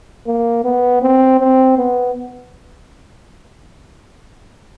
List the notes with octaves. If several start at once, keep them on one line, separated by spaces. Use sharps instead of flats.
A#3
B3
C4
C4
B3